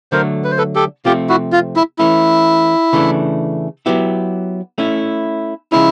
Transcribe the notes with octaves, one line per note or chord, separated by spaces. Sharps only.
D3 F#3 A3 A#4 C5
B4
C5
A4 B4
G4 A4
C3 F3 A3 C4 F4 G4
E4 F#4
F4
E4
E3 A3 C#4 E4
C#3 E3 A3 D4
F#3 B3 E4 G4
A3 C#4 E4
C#3 F3 G#3 C#4 E4